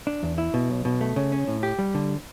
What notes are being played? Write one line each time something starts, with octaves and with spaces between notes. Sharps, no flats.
D4
E2
E4
B2
B1
B2
A3
C#3
C#4
A2
G4
G3
D3